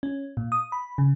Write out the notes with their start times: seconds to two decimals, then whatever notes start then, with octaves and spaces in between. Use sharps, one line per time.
0.03 C#4
0.37 A#2
0.52 D#6
0.72 B5
0.98 C#3